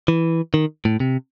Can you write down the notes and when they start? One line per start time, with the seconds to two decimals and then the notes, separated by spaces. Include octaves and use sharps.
0.08 E3
0.54 D#3
0.85 A2
1.00 C3